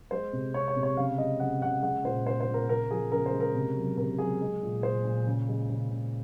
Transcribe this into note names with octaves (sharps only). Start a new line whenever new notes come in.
G#3 C5
C3
C3 C#5
C#5
C3
C#5
C#3 F5
G#3 D#5
C#3 F#5
C#3 F#5
G#3 F#5
A#2 C5
G#3 C5
C5
A#2
A#4
C#3 A#4
F3 G#4
C#3 A#4
C5
G#3
A#4
C3
F#3
C3 A#4
F#3 G#4
G#3
A#2
A#2 C5
A#2
C#3
G#3
C#3
C#3